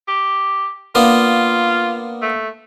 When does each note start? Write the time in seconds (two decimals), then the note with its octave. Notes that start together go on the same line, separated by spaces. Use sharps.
0.08 G4
0.95 A#3 B3 D4 F4
2.22 A3